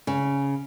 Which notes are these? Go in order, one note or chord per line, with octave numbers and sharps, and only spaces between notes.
C#3